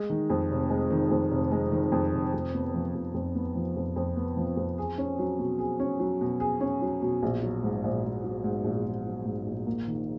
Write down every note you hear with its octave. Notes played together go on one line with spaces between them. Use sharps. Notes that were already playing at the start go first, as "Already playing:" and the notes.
Already playing: G#3
D#3
F2
F1
G#3
D#3
F2
F1
G#3
D#3
F2
F1
F2
B3
F3
F2
F2
B3
F3
F2
F2
B3
F3
F2
G#4
C#4
F#3
B2
G#4
C#4
F#3
B2
G#4
C#4
F#3
B2
A#1
F#3
G#2
A#1
A#1
F#3
G#2
A#1
A#1
F#3
G#2
A#1
A#3
D#3